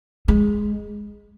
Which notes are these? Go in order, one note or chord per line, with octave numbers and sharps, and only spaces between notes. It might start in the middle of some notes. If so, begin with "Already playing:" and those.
G#3